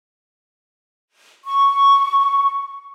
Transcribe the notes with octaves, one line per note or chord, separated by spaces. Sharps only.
C#6